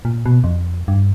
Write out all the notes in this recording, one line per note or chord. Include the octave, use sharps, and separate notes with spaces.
A#2
B2
F2
G2